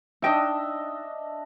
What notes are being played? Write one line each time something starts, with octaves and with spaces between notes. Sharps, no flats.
D4 D#4 D#5 E5 G5 A5